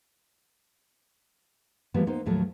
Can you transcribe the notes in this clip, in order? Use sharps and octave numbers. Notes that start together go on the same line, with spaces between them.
E3 F3 G3 G#3 A#3 B3
A#3 B3 D#4 C5
D#2 A2 F3 F#3 F4 A4